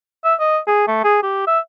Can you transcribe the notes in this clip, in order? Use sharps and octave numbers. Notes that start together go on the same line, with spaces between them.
E5
D#5
G#4
A3
G#4
G4
E5